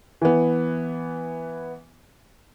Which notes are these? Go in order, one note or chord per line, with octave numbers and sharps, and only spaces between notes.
E3 B3